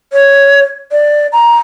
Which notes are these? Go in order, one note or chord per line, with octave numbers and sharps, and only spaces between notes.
C#5
D5
A#5